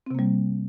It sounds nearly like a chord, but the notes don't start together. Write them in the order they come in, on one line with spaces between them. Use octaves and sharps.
C4 C3 A#3 G3